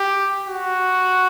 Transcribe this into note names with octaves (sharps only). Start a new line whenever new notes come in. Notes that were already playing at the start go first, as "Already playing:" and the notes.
Already playing: G4
F#4